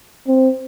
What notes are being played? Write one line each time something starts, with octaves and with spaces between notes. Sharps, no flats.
C4